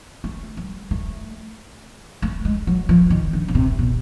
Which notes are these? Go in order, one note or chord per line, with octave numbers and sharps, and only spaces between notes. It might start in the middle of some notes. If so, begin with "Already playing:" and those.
A3
G3
A3
A3
G#3
F#3
F3
D#3
D3
C#3
C3
B2